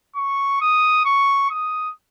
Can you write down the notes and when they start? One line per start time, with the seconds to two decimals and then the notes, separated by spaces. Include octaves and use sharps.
0.16 C#6
0.61 D#6
1.05 C#6
1.51 D#6